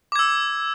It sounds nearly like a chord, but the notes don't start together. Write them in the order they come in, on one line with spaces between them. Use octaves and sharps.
D6 G#6 E6